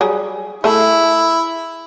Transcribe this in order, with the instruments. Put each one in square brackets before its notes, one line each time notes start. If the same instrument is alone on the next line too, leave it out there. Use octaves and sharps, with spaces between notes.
[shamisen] F#3 G3 G#4
[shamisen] A3 G#4 A4 [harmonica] E4